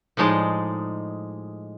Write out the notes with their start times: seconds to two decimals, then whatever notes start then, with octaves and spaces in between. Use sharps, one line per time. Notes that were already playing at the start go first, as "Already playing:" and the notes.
0.17 A2 F3 G#3 D#4 D5